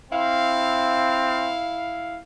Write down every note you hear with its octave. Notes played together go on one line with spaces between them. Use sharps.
C4 E4 F5